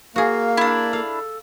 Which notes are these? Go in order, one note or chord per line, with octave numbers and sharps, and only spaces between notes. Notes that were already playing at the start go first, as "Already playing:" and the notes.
A#3 F#4 G#4 F5
D4 E4
A4 F5